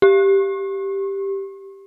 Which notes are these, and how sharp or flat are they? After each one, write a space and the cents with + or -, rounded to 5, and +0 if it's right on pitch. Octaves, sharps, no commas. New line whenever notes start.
G4 +0